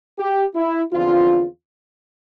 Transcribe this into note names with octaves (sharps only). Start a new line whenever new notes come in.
G4
E4
E2 D3 F3 C4 F4